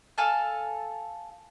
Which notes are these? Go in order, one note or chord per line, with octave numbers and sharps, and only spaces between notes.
A4 F5 G#5 A5